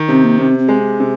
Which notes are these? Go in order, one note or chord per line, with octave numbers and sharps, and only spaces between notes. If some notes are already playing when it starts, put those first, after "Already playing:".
Already playing: D#3
C3 C4
A#3
C3 C4
C4
G#3
C3